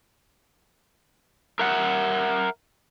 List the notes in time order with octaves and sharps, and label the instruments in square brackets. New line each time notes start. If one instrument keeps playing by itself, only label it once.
[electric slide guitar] A#4 E5 F#5